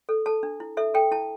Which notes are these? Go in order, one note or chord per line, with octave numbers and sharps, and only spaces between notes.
A4
A4 A5
D4
E4
A4 E5
A4 G5
E4 A5